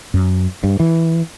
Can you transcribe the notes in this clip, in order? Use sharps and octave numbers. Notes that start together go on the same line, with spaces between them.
F#2
G2
E3